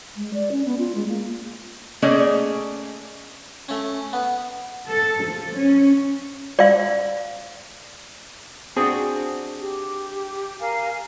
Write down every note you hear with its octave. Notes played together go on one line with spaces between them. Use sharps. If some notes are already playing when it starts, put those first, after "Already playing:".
G#3
D5
C#4
B3
F4
G#3
A#3
A3 A#3 C#4 G#4 D5 D#5
A3 C#4
B3
A4
F3
C#4
D5 F5
C4 D4 F#4 G#4
G4
A#4 F5 G#5